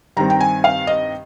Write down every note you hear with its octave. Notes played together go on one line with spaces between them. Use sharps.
G2 D#3 G3 C4 A#5
G5
G#5
F5
D#5